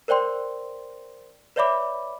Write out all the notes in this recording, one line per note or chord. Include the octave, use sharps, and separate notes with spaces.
A#4 C5 D5 G5 C6
B4 C#5 D5 E5 B5 D6